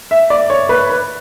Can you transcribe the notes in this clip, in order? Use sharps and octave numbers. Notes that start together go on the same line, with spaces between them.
E5
D5
C#5
B4
B4